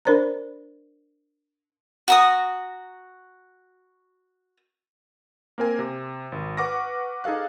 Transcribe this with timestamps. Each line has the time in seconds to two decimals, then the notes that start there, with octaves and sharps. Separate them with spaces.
0.05 D4 A#4 C5 D5 A#5
2.08 F#4 A#5 D#6
5.58 A#3 C4 A#4 G#5
5.79 C3
6.32 G#1
6.57 B4 F#5 C#6 D6 F6 A#6
7.24 D#4 G#4 A4 F5 F#6